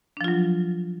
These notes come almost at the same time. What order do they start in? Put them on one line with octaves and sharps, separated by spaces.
D4 F3 F4 F#3